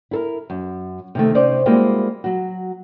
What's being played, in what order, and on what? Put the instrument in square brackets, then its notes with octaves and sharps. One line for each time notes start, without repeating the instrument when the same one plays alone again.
[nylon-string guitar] E4 A4 A#4
F#2
C3 D#3 A3
C3 C#4 D#4 C5 D5
G3 G#3 A#3 C4 E4 F#4
F#3 F#4